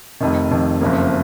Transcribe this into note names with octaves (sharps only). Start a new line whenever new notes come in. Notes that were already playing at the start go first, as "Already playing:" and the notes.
F1 F2 D#3
F1 F2 D#3
F#1 F2 C#3 F3 A#3